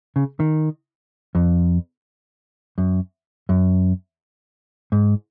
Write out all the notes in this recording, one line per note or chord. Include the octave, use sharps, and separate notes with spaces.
C#3
D#3
F2
F#2
F#2
G#2